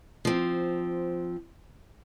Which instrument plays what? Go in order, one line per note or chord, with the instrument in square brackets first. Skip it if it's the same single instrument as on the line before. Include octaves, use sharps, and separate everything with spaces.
[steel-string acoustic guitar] F3 C4